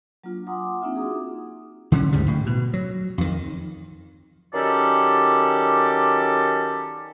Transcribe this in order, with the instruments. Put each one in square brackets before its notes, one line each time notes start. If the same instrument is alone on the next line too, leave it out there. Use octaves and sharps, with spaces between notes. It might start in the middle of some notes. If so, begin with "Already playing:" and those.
[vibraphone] F#3 A#3 D4 F4
F#5 G#5 A#5 C6 D6 D#6
A#3 C4 D4 D#4 F4 E5
F#4 G#4 A#5 D6 D#6
[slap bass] D3 F#3 C#4
D2 G#2 C#3 G3
A2
B2
F#3
F2 D#3
[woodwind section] D#3 F#3 C#4 G4 A4 D5